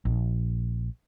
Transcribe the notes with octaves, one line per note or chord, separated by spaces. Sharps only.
A#1